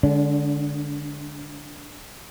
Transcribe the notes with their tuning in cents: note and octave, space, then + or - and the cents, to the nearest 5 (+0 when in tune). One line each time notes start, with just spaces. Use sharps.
D3 +0 G#3 +0 D4 -40